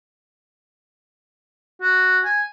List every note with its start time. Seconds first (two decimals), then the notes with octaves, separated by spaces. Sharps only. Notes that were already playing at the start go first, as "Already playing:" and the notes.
1.81 F#4
2.24 G#5